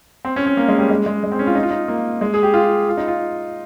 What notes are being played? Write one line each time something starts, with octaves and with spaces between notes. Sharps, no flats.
C4
C#4
C#4
A#3
G#3
G3
G#3
G#3
G#3
C4
C#4
F4
D#4
F4
D#4
A#3
G#3
G#4
G4
F4
F4
D#4
F4